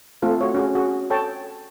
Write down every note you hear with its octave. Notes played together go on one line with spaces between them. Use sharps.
A3 C4 F4 A4
F#4 C#5
C#4 F#4 G#4
F#4 G#4
A4 C#5 G5 A5